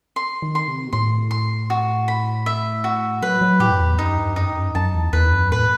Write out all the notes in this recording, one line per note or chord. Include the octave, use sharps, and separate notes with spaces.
C6
D#3
C6
C3
B2
A2 C6
C6
F#4
B5
E5
F#4
F#3 B4
F#3
A2 G4
F#2
E2
F#2 D#4
G2
F#2 D#4
G2
F#2
F#2 A5
E2
E2 B4
F#2
A2 B4